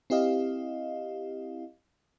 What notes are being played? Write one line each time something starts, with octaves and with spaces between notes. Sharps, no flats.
C4 E4 G4 D#5 F5